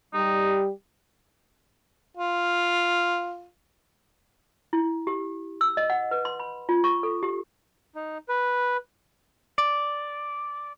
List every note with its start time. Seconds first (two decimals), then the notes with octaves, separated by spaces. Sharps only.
0.13 G3 D#4 G4
2.18 F4
4.73 E4
5.07 G4
5.61 E6
5.77 D#5
5.90 F#5
6.11 B4
6.25 C6
6.40 B5
6.69 F4
6.84 C#6
7.03 A4
7.23 G4
7.95 D#4
8.29 B4
9.58 D5